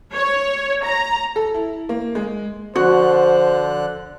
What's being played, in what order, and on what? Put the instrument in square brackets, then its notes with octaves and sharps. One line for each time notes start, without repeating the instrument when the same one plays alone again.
[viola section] C#5
A#5
[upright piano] A4
E4
A#3
G#3
[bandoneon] D3 F#6 [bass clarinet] F3 [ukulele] F#4 [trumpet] C5